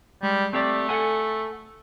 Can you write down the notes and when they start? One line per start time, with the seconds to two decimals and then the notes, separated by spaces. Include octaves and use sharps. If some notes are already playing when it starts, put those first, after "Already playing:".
0.23 G3 G#3
0.53 A3 C4 G4 D5
0.89 A4 F#5 G#5